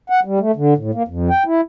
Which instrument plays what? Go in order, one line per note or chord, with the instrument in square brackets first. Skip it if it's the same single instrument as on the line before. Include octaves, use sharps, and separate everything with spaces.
[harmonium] F#5
G3
A3
D3
A2
A#3
F2
G5
E4